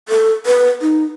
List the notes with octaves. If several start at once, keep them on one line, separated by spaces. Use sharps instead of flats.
A4
B4
D#4